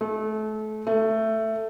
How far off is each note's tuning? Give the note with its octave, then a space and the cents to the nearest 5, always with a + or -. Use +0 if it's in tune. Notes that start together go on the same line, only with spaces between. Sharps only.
A3 -30
A3 +10